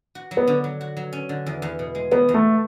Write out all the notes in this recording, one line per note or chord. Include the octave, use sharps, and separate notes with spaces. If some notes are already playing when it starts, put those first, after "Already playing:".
F#4
F#3
B3
D3
F#3
F#4
F#3
C#4
D3
E2
E2
B2
G#3
E2 B3
E2
A3